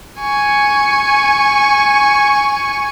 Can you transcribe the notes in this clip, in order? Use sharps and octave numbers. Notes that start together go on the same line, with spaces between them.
G#5 C#6